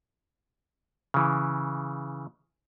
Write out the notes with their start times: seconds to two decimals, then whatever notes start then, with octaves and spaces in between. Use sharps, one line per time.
1.14 C#3 E3